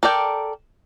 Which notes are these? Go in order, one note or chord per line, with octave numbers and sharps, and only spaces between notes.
A4 A#4 D5 G5